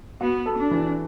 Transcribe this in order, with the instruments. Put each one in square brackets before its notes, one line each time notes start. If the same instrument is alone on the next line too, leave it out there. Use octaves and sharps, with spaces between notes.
[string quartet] B3 [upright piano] F#4
[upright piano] A4
[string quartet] D4
[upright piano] E3